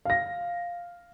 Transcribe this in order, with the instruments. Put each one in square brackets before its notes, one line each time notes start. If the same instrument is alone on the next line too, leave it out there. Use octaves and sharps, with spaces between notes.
[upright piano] F5 A#6